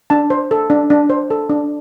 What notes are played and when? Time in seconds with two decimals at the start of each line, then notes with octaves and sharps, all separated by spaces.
0.10 D4 A5
0.30 C5
0.51 A4
0.70 D4
0.90 D4
1.10 C5
1.30 A4
1.49 D4